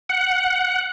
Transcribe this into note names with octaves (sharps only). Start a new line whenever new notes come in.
F#5